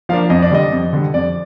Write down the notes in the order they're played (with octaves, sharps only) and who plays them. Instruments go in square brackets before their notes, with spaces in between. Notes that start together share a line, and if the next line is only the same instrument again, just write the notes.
[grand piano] F3 A#3 D4 F5
F2 D#5
D5
D3 G3 D#5
F2
D3 G3
F2 D5